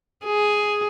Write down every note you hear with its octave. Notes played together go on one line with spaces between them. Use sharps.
G#4